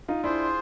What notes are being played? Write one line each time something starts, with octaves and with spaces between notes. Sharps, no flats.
D#4 F4
D4 E4 F4 G#4 C5